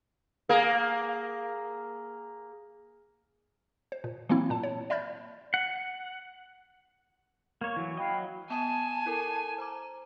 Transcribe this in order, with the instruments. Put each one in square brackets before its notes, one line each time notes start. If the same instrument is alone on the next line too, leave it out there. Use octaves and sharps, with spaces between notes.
[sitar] A#3 G#4
[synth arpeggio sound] C5
A#2
E3 F#3 A#3 C4 E4
A#2 A5
C#5
D5 E5 B5 F6 G6 A6
[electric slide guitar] F#5
[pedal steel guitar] A#3 C#5 [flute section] C#6
[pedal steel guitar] E3 F#3
[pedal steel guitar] F#3 D#5 [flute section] F5 G5 B5
[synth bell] B3 D#6 [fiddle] G#5 [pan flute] A5
[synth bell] E4 A4 A#4
C5 A#5 D6